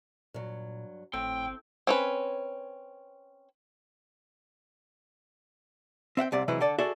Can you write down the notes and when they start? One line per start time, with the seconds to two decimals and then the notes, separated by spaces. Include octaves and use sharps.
0.34 G2 A#2 F#3
1.13 G#1 A2 C4 G5
1.87 C4 C#4 B4
6.17 C4 E5 F#5 G5
6.32 C2 C3 D5
6.48 C3 E3 F#3 G#3 E4 B4
6.60 D3 A4 D5
6.79 F#4 G#4 A4 D5 E5